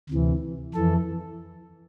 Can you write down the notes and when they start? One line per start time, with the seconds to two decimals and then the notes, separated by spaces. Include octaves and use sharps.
0.10 D2 C3 E3
0.74 F2 E3 A4